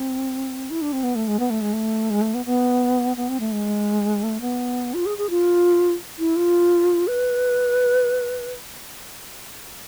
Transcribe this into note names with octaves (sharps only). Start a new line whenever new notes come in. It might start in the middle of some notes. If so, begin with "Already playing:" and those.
Already playing: C4
E4
D4
C4
B3
A3
G#3
B3
A3
G#3
A3
G#3
A3
B3
B3
B3
C4
A3
G#3
A3
B3
F4
G#4
G#4
F4
E4
F4
B4